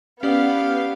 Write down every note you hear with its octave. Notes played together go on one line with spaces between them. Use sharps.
B3 C#4 G4 D5 F5 D#6